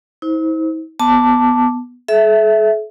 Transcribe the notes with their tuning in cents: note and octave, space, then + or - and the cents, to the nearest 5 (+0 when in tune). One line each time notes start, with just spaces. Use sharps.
E4 -45 C5 +0
B3 +0 A5 +0 D6 +0
A4 -45 E5 +0